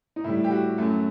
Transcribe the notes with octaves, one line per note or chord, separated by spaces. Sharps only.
D#4
A2 G3 E4
G4
F#4
F#2 F#3 A3